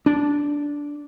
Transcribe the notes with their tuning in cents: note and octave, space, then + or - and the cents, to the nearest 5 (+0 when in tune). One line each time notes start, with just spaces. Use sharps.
D4 -10